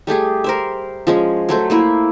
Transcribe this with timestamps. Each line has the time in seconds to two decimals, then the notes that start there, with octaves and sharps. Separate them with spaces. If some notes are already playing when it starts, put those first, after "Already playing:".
0.07 G3 A3 G4 G#4
0.44 A#4 C5 E5
1.07 F3 G#3 C#4
1.49 F#3 A3 C5
1.70 A3 A#3 E4